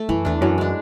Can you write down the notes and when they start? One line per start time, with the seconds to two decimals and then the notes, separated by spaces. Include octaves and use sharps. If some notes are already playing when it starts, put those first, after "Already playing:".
Already playing: A3
0.09 F#2 E3
0.25 E2 A3 D4
0.41 F#2 E3
0.58 G#3 D4